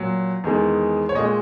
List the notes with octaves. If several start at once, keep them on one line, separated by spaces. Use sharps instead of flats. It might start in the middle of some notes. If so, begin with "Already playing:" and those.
Already playing: A#2 F#3
E2 D#3 G#3
C#5
A#2 G#3 D#5